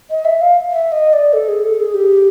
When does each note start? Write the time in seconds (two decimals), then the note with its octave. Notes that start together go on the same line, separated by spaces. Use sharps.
0.10 D#5
0.25 E5
0.41 F5
0.71 E5
0.92 D#5
1.13 D5
1.33 A4
1.48 G#4
1.64 A4
1.80 G#4
1.94 G4